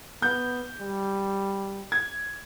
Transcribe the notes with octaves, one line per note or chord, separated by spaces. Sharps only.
B3 G6
G3
G#6